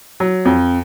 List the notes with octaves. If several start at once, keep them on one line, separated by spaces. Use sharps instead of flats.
F#3
F2